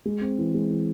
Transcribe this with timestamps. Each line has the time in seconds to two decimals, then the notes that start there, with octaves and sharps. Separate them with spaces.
0.05 G#3
0.21 C4
0.38 E3
0.54 G#3
0.71 E3